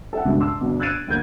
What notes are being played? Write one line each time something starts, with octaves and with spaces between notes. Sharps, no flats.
A4 E5 F#5
C#2 G2 B2
A5 C6 D6 E6
G1 B2 D4
E6 F#6 G#6 A6 D7 D#7
G1 D2 D3 A#3 G6 G#6